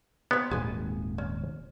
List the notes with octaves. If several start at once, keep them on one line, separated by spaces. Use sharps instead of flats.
B3 C4 C#5
D#1 G#1 D#3 G#4 G#5
C#4